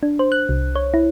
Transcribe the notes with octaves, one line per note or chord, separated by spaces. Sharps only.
D4
C5
F#6
C2
C#5
E4